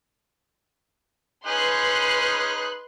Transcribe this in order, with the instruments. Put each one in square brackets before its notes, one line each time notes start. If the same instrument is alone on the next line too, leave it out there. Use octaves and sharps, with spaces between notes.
[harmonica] C#4 D#4 G#4 [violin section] B4 C6 F#6